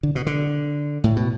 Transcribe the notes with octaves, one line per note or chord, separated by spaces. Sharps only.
D3
B2
D3
A2
B2